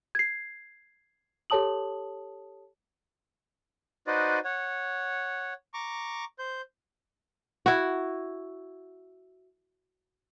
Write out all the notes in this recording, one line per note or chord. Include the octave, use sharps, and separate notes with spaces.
G#6 C7
G4 A4 C#5 A5 D#6 F#7
D#4 F#4 B4 C5 D5 D#5
C#5 F#5
A#5 C#6 D6
C5 G6
E4 F#4